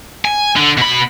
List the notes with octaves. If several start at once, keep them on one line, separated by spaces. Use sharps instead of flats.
G#5
D3
B2 B5